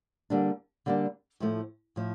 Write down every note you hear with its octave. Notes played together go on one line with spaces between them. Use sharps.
D3 G3 A#3 D4
D3 G3 A#3 D4
A2 F3 A3
A2 F3